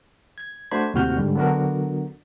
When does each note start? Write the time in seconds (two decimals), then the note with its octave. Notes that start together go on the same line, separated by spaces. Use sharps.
0.38 G#6
0.71 A3 D4 F#4 C5 B5 G#6
0.94 D#2 A2 C3 F#4 F6 G6
1.17 G#2 D3 G3
1.35 D3 F#3 B3 D4 F#4 A#4